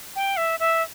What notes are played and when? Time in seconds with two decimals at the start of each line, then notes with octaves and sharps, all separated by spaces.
0.16 G5
0.37 E5
0.60 E5